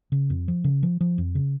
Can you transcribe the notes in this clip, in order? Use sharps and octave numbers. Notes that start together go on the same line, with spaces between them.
C#3
F2
F3
C#3
F3
F3
F2
C#3